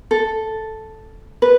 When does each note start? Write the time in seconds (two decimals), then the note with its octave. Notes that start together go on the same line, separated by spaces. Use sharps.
0.11 A4
1.42 B4